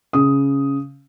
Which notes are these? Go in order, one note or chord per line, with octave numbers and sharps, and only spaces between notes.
C#3 D#6